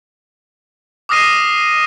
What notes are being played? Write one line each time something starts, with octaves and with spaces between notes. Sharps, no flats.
D6 D#6 F6 A#6 C7 D#7